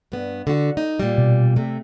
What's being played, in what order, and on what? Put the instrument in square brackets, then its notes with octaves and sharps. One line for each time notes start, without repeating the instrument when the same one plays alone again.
[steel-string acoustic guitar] G2 B3
D3 F#4
D#4
A#2 G3
[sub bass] B2
[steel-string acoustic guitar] C3 A3